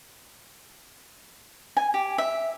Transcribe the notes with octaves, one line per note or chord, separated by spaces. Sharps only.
G#5
G4
E5